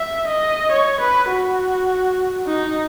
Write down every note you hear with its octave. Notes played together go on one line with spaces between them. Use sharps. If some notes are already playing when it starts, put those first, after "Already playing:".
Already playing: E5
D#5
C#5
B4
F#4
D#4